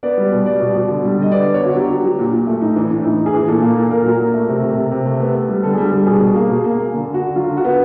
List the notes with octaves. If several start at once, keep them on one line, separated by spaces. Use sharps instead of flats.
B3 D5
G3
B2
G3 D5
B2
B2
D3
G3
D3 D#5
B3 D5
B3
C#5
D3 F#4
F#3 G4
F#3
F#3
A#2
A#2
A3
A2 D#4
E3 D4
A2 D4
E3 D#4
A2
G#4
E3
A#2 A4
A#3
A#2
A#2 A#4
F#3
A#2
A3
C3
C3
C3
C3
A3
B3
B3
G3
D3 A4
G#4
G3
G#4
G3 G4
A4
B2 G#4
B2
A#3
B2
A#3
A#3
D3
D3
F#4
D3
F#3 F4
D3
F#4
B3